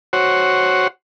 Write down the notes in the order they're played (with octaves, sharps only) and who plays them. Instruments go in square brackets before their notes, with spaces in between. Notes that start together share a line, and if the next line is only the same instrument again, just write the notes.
[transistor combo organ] F#4 C5 C#5 F#5